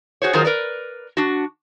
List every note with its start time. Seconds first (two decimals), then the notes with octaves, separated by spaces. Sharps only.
0.22 F#4 G#4 C5 C#5
0.33 D#3 F#3 F4 G#4 A#4 C5
0.44 A#4 B4 D5
1.17 D4 F#4